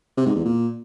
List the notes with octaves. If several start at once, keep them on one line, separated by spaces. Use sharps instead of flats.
C3
G#2
E2
A#2